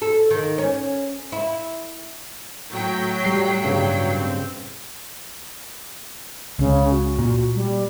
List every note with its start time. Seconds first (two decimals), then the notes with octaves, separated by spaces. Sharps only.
0.02 A4
0.30 D#3
0.58 C#4
1.32 E4
2.71 A2 F#3 G5
3.24 G3 C7
3.64 G2 C#3
4.18 C4
6.59 C#2 C#3
6.91 F#4
7.19 A#2
7.55 G3